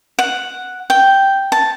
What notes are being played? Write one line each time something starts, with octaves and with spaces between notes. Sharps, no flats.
F#5
G5
A5